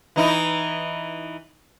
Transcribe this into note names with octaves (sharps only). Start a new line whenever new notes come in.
E3 D#4 E4